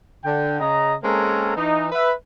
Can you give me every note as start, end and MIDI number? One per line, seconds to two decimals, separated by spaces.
0.24 0.58 50
0.24 0.58 79
0.60 0.95 49
0.60 0.95 75
0.60 0.95 82
1.03 1.52 56
1.03 1.52 58
1.03 1.52 60
1.03 1.52 61
1.03 1.52 69
1.03 1.52 70
1.57 1.87 52
1.57 1.87 63
1.92 2.12 71
1.92 2.12 76